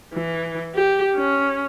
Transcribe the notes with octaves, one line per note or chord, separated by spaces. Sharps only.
E3
G4
C#4